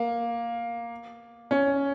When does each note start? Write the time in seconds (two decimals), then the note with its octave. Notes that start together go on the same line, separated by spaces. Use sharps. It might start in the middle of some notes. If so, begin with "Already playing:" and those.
Already playing: A#3
1.51 C#4